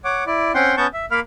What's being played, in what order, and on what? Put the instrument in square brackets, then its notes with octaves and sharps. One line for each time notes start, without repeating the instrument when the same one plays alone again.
[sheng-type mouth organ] C#5 F#5 D6
E4 D5
C4 C#4 F#5 G5 C6
B3 C#4 F#5 A5 C#6 G6
E5
A#3 A#4 F5 B5 F6